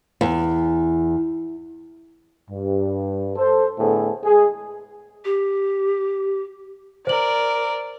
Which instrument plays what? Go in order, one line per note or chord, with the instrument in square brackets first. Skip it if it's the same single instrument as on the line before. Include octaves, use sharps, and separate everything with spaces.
[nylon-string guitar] E2
[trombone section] G2
A4 C5
A2 D3 B3 G#4 A4
G#3 G#4
[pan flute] G4
[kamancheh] A#4 D5 [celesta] C5 F#7